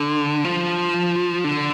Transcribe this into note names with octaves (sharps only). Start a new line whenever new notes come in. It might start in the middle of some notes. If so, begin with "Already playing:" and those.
Already playing: D3
F3
D3